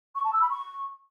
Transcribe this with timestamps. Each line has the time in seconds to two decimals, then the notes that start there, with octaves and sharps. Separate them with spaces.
0.15 C#6
0.24 A5
0.33 E6
0.41 B5
0.50 C#6